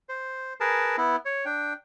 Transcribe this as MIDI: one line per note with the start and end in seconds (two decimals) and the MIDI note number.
0.09 0.53 72
0.60 0.96 68
0.60 0.96 70
0.60 0.96 71
0.60 0.96 81
0.98 1.16 59
0.98 1.16 64
1.25 1.45 73
1.45 1.73 62
1.45 1.73 79